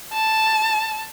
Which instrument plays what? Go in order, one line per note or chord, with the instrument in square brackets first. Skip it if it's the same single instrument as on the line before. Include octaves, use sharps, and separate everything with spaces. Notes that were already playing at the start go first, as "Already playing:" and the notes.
[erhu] A5